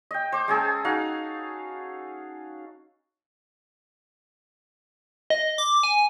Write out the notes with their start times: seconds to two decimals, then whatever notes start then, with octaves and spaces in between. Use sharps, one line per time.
0.11 D#5 G5
0.32 C5 D6
0.48 G#3 C#4 G#4 A4
0.84 D#4 F#4 F5
5.30 D#5
5.58 D6
5.83 G#5